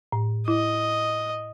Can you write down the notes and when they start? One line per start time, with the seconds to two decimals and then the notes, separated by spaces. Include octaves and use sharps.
0.12 A2
0.48 E4 D#5